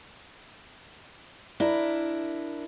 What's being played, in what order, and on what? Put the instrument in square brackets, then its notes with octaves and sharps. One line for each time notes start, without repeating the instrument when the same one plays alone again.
[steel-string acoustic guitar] D4 E4 A#4